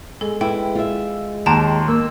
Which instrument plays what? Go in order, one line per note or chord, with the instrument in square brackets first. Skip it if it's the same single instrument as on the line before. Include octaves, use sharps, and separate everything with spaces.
[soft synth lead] G#3 [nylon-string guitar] G#4 [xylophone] A4
[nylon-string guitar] E4 B4 [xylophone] G5
[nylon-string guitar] F4 E5
[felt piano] D#2 C6 [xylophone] G5 A5 A#5
[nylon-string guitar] A#3 [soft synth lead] E6